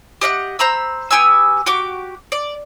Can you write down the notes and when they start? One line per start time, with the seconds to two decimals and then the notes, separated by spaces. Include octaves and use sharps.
0.21 G4 D#5 F5 F#5
0.59 C5 A#5 B5 E6
1.11 B3 G4 G#5 E6
1.66 F#4 G4 D6
2.32 D5